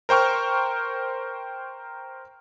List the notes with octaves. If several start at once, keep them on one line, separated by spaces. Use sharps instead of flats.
A#4 C5 G5 C#6 F6